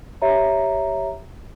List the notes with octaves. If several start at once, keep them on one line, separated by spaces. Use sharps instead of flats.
G4 C#5 E5 A#5